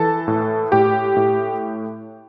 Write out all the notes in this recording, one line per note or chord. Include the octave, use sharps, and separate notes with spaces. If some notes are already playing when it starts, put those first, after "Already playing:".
Already playing: E3 A4 A5
A2
A2 G4 G5
A2